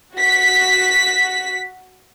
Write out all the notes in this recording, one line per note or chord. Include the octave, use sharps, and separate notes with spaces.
F#4 B6